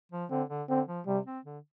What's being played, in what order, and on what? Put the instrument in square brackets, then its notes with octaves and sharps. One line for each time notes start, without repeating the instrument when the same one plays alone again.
[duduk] F3
[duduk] D3 [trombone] C4
[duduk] D3
[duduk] D3 [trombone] C4
[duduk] F3
[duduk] C3 [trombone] G3
[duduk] C4
D3